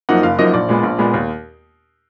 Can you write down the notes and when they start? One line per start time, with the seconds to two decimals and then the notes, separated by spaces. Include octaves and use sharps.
0.09 F#2 F3 A#3 D#4 F#5
0.23 F#1 F5
0.39 F#2 F3 A#3 D#4 D#5
0.53 A#1 D5
0.69 A#2 G#3 B3
0.83 A#1
0.99 A#2 G#3 B3
1.14 D#2